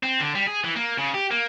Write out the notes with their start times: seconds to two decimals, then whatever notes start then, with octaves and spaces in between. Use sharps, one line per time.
0.03 C4
0.20 D3
0.35 G3
0.47 G#4
0.64 E3
0.76 A#3
0.98 C#3
1.14 G4
1.31 A#3